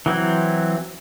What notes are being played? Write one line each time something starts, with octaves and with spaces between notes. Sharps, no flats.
E3 F#3 C4 E4